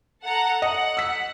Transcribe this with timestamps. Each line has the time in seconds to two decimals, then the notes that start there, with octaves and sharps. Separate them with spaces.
0.25 A4 F#5 A#5
0.62 D#5 F#5
0.97 E6 B6